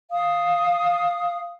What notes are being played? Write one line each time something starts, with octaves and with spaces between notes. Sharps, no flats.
F5 D#6